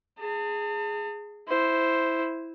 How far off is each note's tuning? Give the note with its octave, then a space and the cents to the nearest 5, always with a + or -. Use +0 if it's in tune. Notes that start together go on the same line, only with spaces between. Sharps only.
G#4 +0 A5 +40
E4 +0 C5 +0